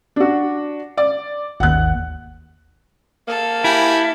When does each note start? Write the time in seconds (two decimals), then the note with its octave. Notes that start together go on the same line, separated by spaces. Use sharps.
0.16 D4 F#4
0.97 D5
1.60 G#1 D#2 F#5 F#6
3.28 A#3 A4
3.64 E4 G4 G#5 B5